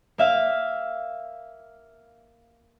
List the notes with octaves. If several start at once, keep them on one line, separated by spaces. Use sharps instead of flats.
A#3 E5 F5